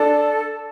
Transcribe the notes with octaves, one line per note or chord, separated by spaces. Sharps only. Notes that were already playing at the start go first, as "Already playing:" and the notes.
Already playing: D4 A4